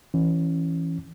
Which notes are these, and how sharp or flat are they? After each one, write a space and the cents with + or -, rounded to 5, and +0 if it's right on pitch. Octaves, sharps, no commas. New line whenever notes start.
E3 +0 C#4 -15